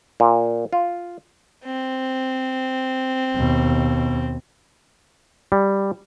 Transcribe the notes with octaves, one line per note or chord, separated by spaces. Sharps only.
A#2
F4
C4
D#2 B2
G3